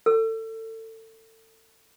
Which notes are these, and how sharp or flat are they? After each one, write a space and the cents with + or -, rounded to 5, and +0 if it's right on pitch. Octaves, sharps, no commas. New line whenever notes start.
A4 +25 E6 +40